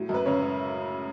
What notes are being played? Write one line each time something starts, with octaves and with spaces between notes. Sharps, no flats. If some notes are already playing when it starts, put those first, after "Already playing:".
Already playing: A2 F#3
F#2
B4
C#3 C#5
C#4